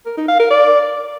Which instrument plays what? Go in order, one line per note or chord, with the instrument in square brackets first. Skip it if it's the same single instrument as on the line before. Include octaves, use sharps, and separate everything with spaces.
[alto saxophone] A#4
D#4
F5
A#4
D5